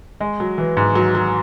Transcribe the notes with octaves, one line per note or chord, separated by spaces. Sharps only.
G#3
F#3
E3
G#2
F#3
F#3